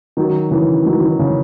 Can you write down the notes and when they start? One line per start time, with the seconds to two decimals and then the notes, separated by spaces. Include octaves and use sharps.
0.17 D#3 F#3
0.51 C#3 E3
0.86 D#3 F#3
1.03 D#3
1.19 C#3